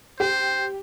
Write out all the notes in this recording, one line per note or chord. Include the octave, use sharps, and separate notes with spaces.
G4 C5